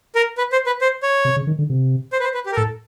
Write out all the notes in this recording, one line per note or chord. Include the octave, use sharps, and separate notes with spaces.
A#4
B4
C5
B4
C5
C#5
C3
C#3
D#3
D3
C3
C5
B4
C5
B4
G4
A#4
A2 A4